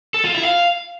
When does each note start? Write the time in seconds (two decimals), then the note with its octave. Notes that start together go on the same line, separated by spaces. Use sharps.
0.14 A4
0.24 F4
0.35 E4
0.45 F5